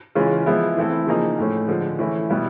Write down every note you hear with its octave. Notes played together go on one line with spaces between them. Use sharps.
C#3 E3 G#3 C#4 F4
F3 G#3 B3 E4
E3 A3 C4 E4 A4
C#3 F3 A#3 D#4 G#4
A2 F3 A3 C#4
D3 F3 G#3
E3 A3 C#4 E4
B2 G3 B3 E4